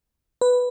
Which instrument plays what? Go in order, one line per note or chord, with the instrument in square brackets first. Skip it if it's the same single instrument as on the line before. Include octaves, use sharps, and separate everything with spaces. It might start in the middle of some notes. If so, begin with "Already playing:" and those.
[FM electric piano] B4